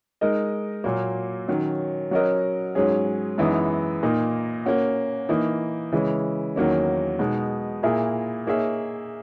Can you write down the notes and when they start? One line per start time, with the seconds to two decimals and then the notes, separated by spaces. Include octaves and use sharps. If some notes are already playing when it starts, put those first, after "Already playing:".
0.21 G#3 D#4 A#4 D#5
0.84 A#2 F#3 A#3
1.48 D#3 F#3 C#4
2.11 F#3 C#4 F#4 A#4 D#5
2.75 G#2 F#3 C#4 G#4
3.38 F#2 E3 G#3 B3 D#4
4.03 A#2 A#3 D#4
4.66 A#3 C#4 F#4
5.29 E3 A#3 D#4
5.92 C#3 E3 G#3 C#4
6.56 E2 D#3 F#3 A#3 C#4
7.19 B2 G#3 D#4
7.83 A#2 A#3 E4 G#4
8.47 A#3 D#4 G#4 C#5 E5